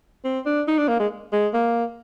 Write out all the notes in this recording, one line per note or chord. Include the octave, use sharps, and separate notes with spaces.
C4
D4
D#4
D4
A#3
G#3
G#3
A#3